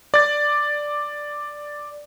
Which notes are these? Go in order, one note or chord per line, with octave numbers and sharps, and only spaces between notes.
D5 A6